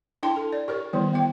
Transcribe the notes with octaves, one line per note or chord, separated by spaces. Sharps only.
D4 E4 G5 A5 C6
A4
D5
G4 A#4 C#5
D#3 E3 G3 B3 E4
B3 G5